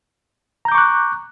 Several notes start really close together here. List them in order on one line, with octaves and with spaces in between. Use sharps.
A#5 G6 D6 C#6 F#6